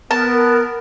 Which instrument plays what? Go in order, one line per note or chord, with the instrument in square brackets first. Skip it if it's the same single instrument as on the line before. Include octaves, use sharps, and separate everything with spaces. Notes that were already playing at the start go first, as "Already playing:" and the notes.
[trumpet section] B3 [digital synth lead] A#4 [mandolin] A5